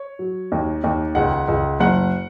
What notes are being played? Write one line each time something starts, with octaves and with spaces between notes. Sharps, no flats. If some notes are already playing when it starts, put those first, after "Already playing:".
Already playing: C#5
F#3
D#2
D#2
C#2 F#5
C#2
F#1 F#5